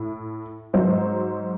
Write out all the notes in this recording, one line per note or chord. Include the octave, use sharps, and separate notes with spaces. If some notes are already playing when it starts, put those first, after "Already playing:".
Already playing: A2
G#2 F#3 C5